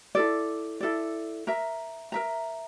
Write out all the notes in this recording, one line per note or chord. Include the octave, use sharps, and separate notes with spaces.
E4 A4 D5
E4 A4 D5
A#4 E5 A#5
A#4 E5 A#5